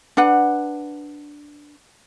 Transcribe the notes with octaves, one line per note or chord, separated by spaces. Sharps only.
D4 B4 F#5